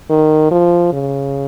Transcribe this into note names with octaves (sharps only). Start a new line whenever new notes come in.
D#3
F3
C#3